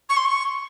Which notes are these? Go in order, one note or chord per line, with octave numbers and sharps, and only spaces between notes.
C#6
C6
C#6